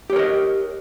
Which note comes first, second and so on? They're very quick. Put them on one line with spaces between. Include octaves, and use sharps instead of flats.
G4 C#5 A#4 D#5